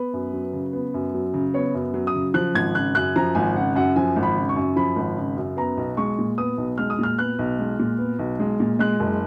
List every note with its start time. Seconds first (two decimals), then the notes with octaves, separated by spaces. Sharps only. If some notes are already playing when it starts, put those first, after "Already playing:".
Already playing: B3 B4
0.13 F#2
0.33 F#3
0.53 C#3
0.73 B3
0.94 F#2
1.14 F#3
1.34 C#3
1.54 B3 C#5
1.74 F#2
1.94 F#3
2.07 D#6
2.15 C#3
2.34 F3 F#6
2.55 G#1 G#6
2.75 C#3 F#6
2.95 F#2 F#6
3.16 F3 A#5
3.35 G#1 G#5
3.55 C#3 F#5
3.75 F#2 F#5
3.96 F3 G#5
4.16 G#1
4.23 B5
4.37 C#3
4.49 C#6
4.56 F#2
4.76 F3 B5
4.96 G#1
5.17 C#3
5.36 F#2
5.57 B3 A#5
5.77 B1
5.97 G#3 C#6
6.18 A#2
6.38 B3 D#6
6.58 B1
6.78 G#3 F6
6.90 D#6
6.99 A#2 F6
7.19 B3 F#6
7.39 B1
7.59 G#3
7.79 A#2
7.99 B3
8.19 B1
8.40 G#3
8.60 A#2
8.79 G#3 F#6
9.00 F#1